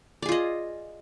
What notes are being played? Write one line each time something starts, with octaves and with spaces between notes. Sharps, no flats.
F4 G#4 D5 D#5